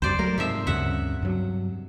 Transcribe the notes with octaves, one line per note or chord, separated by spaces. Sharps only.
C#2 F#2 G3 C5 D5
F#3 A3 A#4
G#2 C3 F3 E5
D2 G2 C#3 E5 F#5
G2 F#3